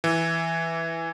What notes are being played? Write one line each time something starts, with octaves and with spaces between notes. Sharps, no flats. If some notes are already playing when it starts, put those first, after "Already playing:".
E3